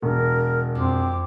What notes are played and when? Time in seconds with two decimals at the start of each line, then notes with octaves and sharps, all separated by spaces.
0.02 E1 A#4
0.75 F2 C4 D6